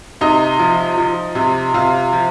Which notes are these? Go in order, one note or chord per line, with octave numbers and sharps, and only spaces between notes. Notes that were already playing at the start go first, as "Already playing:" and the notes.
C3 D#4
F3
F3
C3
C3 F4
F3